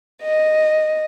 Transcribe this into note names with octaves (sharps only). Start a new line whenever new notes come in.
D#5